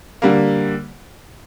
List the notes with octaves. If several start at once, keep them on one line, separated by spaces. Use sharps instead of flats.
D3 G3 A#3